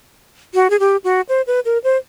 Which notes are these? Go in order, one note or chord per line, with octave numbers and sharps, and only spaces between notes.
F#4
G#4
G4
F#4
C5
B4
A#4
C5